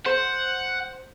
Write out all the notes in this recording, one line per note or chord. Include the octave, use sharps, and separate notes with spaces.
C5 F#5